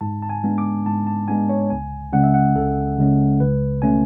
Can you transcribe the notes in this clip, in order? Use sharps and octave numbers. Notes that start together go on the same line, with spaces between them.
G#2 A5
A5
G#5
G#3 B3 D4
D6
G#2 A5
A5
G#3 B3 D4 G#5
C#5
C#2 G#5
C#3 G#3 C#4 F#5
E5
F#5
C#2 A4
C#3 G#3 C#4
C#2 B4
B2 A3 C#4 G#5